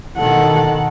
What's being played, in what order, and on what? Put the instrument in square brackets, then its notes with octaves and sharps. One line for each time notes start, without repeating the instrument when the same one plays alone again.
[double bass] B2 D#3 [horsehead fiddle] A4 F#5